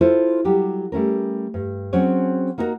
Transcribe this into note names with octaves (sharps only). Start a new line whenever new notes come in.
E4 F4 A4 C5
F#3 G3 G4
G3 A3 C#4 A#4
G2
F#3 C4 C#4 G#4 C#5
A#3 D#4 F#4 G#4 A#4